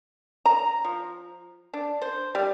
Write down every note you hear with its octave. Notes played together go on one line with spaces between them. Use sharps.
A#5
F3
D4
C5
G3